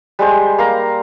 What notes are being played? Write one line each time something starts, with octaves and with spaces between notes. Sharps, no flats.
G3 G#3 C5
A#3 F5 A#5